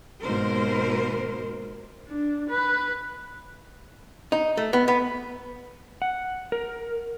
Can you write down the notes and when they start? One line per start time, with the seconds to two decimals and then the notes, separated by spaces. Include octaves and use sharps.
0.24 D#2 G#2 B2 A#4 C5
2.08 D4
2.50 B4
4.32 D#4
4.57 A3
4.73 B3
4.88 B3
6.02 F#5
6.52 A#4